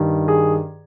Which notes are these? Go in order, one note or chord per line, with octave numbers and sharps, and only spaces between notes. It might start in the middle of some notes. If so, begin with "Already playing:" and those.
Already playing: G2 D#3
G#4